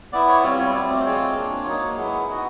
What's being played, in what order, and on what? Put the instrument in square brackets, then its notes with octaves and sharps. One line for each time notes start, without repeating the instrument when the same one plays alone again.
[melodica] B3 E4 D5
C#5
G3 C4 F4 C#5
C#5
F#3 A3 C4 D5
D5
C5
G#3 C4 F4 C#5
A#3 D4 F4
F#3 A#3 D#4
G#3 B3 E4
B3 D#4 F#4